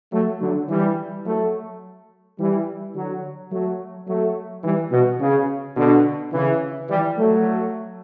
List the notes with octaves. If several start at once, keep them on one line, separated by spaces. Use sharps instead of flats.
F#3 A3
D3 F#3
E3 G3
F#3 A3
E3 G3
D3 F#3
F#3 A3
F#3 A3
E3 G3
B2
C#3
B2 D3
C#3 E3
E3 G3
F#3 A3